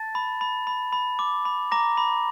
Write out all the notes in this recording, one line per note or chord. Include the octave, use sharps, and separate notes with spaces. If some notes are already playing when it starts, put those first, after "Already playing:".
Already playing: A5 A6
B5
B5
B5
B5
D6
B5
A#5 D6 A#6
B5